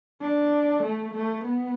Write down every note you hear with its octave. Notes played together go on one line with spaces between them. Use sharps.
D4
A3
A3
B3